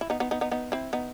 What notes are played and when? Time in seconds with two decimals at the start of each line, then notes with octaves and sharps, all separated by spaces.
0.01 E4
0.10 B3 D#4
0.20 B3 D#4
0.31 B3 D#4
0.41 B3 D#4
0.51 B3 D#4
0.72 C4 E4
0.93 B3 D#4